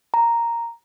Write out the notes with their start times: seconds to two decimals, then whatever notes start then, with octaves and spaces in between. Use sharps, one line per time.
0.14 A#5